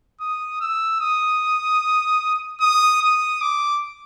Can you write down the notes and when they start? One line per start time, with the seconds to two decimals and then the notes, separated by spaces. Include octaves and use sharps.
0.20 D#6
0.61 E6
1.00 D#6
2.61 D#6
3.02 D#6
3.41 D6